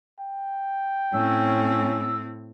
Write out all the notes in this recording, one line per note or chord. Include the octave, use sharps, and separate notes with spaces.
G5
A2 C4 C#4 E6